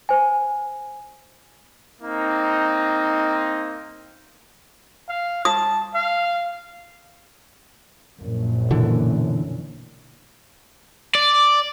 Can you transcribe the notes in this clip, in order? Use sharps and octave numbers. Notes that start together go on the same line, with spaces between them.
C5 G#5
A#3 C4 D#4
F5
A5 D#6
F5
A#1 F#2
B2 D3 E3
D5